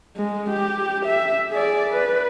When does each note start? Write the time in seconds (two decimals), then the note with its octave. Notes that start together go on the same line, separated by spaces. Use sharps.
0.17 G#3
0.50 G4
1.06 E5
1.51 G#4 D5
1.90 B4